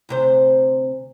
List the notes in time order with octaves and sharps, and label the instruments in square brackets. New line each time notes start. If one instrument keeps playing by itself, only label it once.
[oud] D2 C3 C5